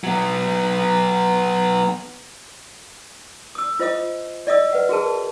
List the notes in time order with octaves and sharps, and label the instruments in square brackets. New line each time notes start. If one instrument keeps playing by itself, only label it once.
[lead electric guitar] F#3 B3
[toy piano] D#6 E6
F4 C5 D#5 F5 D#6
D5 D#5 F5 D#6 E6
B4 F#5
F#4 G#4 A#4 A5